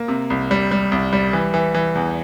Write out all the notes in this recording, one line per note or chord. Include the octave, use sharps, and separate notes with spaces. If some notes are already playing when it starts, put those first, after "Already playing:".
Already playing: A#3
C3
C2
G3
G3
C2
G3
E3
E3
E3
E2